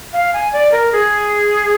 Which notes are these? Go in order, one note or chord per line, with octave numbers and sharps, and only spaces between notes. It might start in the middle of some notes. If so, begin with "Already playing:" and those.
F5
G#5
D5
A#4
G#4